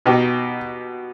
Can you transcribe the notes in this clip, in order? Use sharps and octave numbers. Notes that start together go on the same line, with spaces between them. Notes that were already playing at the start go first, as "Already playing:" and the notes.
B2 B3 D#4 G4